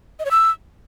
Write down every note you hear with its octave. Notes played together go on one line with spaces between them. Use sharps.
D#5
C#5
E6